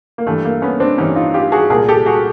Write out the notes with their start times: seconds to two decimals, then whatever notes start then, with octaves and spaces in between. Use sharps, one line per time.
0.18 A#3
0.27 G2 E3 A3
0.45 A#3
0.62 B3 C#4
0.80 C4 D4
0.98 G2 E3 C#4 D#4
1.16 D#4 F4
1.34 F4 G4
1.52 F#4 G#4
1.70 C2 A#2 G#4 A#4
1.88 G4 A4
2.06 F#4 G#4